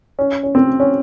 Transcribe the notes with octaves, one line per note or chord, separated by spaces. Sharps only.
C#4
C#4
C4
C#4